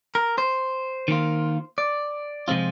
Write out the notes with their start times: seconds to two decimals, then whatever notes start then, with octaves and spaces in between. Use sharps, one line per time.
0.15 A#4
0.38 C5
1.08 D#3 A#3 F4
1.78 D5
2.48 C3 F3 G#3 C4 F4